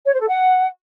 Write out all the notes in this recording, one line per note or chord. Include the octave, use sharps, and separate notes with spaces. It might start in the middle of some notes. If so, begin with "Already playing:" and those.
C#5
C5
A4
F#5